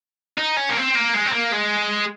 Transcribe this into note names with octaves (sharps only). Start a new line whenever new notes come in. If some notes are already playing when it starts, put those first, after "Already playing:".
D#4
C#4
A#3
C4
A#3
G#3
C4
A#3
G#3